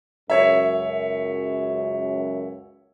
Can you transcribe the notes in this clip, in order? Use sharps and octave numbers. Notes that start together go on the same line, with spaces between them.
C#2 F#2 C#5 E5